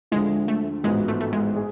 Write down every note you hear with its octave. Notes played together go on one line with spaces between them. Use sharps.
D2 D3 F3 G#3
A3
A1 G#2 F3 G#3 B3 F#4
A3
A3
G#3
G#4